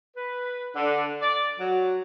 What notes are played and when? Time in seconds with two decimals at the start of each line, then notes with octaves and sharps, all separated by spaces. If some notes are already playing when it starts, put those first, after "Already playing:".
0.15 B4
0.75 D3
1.21 D5
1.59 F#3